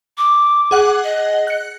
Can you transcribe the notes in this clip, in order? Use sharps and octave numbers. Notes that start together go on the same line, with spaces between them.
D6
G#4 F#5 F#6
D#5
F#6 C#7